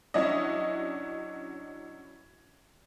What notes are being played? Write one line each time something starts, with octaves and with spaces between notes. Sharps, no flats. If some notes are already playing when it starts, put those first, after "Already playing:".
F#3 C#4 D4 E4 D#5